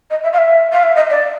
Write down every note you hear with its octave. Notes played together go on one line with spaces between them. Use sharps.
D#5
E5
F5
E5
F5
E5
D#5
D5